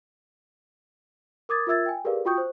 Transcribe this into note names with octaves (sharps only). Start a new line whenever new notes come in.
A#4 D6 D#6 G#6 A6
F4 A#4 E5 E6 G#6 A6
G5 G#5
G4 G#4 A#4 B4 D5 F5
F4 F#4 G5 C#6 D#6 G6
C5